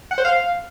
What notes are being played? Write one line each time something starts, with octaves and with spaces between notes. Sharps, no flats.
F#5
C5
F5